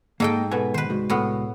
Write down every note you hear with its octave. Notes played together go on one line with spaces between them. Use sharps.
G#2 A#3 A4 D#5 G5
B2 A4 B4 G#5
D#3 B4 C5
C2 G#3 F#4
A2 B3